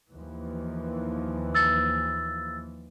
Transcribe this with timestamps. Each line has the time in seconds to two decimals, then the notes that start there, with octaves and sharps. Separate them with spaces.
0.13 D#2 E3 F3
1.54 E6 A6